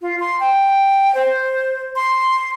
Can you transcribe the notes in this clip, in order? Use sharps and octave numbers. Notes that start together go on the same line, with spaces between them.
F4
C6
G5
C5
C6